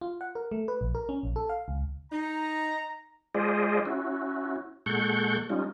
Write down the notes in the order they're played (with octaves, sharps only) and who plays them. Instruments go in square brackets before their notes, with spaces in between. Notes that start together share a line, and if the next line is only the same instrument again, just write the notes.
[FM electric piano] F4
F#5
A#4
A3
B4
A#1
A#4
C#4
A#1
A4
F5
C#2
[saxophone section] D#4 [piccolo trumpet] A#5
[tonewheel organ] G#3 F4 G#4 C5 D5 D#5
C#4 E4 F#4
A#2 G#3 A4 F#5 C#6 G6
G3 C#4 D#4 F4